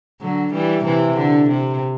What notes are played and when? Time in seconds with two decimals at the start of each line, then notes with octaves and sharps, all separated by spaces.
0.21 D3 F#3
0.53 E3 G3
0.85 C3 E3
1.18 D3
1.50 C3